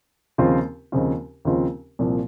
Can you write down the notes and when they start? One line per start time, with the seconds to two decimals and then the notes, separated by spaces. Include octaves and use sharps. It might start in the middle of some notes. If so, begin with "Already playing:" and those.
0.38 D#2 C#3 F3 C4 F4
0.92 D#2 C#3 F3 C4 F4
1.45 D#2 C#3 F3 C4 F4
1.99 C2 A#2 F3